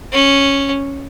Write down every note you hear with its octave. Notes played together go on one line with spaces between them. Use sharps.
C#4